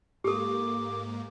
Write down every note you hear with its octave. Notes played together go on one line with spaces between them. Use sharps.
G#2 A#3 G4 A4 D6